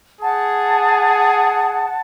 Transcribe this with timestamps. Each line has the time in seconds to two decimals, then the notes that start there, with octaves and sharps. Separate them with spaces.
0.21 G#4 F#5 A5